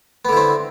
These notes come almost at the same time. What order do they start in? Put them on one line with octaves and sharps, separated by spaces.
B3 D3 E4 C4